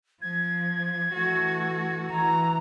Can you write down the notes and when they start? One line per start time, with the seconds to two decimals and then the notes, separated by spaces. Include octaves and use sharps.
0.22 F3 G#6
1.13 E3 A3 F#4
2.12 E3 A#5